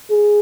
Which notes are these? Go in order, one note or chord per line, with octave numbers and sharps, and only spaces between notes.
G#4